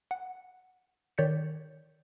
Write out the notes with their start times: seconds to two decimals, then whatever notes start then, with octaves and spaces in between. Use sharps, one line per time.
0.11 F#5
1.18 D#3 C#5 D5 G6 B6 C#7